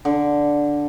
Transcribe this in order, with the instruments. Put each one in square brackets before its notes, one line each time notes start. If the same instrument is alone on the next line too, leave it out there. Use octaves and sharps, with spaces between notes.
[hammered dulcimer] D3